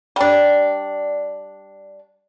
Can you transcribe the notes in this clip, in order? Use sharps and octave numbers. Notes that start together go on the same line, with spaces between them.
G3 D4